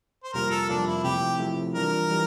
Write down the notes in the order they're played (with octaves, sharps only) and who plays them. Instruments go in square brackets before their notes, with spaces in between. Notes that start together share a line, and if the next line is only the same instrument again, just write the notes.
[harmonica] C5
[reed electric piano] F2 C3 G3 A#3 F4 [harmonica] A#4
[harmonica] A4
[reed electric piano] F2 C3 G3 A#3 F4 [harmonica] D4
[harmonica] E4
[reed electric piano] C3 F3 A3 E4 [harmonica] G4
[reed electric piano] C3 F3 A3 E4
[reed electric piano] E3 G3 D4 F4 [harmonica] A#4
[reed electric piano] E3 G3